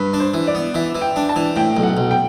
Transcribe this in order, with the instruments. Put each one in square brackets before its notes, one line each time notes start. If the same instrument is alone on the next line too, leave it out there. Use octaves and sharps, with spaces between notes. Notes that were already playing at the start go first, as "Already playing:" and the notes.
Already playing: [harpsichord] G2 [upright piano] B4
[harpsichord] D4
[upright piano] C5
[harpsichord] E3
[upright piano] D5
[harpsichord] B3
[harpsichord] E3 [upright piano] E5
[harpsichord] E3
[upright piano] G5
[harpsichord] D4
[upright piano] A5
[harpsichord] E3
[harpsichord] A2 [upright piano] G5
[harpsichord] B1
[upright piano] F#5
[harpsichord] B1
[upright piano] G5